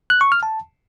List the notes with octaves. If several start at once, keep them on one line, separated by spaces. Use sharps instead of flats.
F#6
C#6
F6
A5